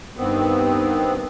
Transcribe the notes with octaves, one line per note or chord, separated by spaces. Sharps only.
G2 D#3 B3 C4